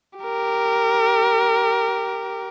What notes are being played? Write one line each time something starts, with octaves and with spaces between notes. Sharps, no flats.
G4 A#4